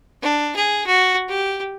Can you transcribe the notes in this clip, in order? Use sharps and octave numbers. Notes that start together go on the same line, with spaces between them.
D4
G#4
F#4
G4